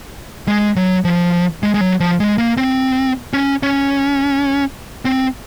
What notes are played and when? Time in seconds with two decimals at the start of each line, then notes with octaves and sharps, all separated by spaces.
0.48 G#3
0.76 F#3
1.05 F3
1.63 G#3
1.74 G#3
1.81 F#3
2.00 F3
2.20 G#3
2.38 A#3
2.57 C4
3.33 C#4
3.63 C#4
5.05 C4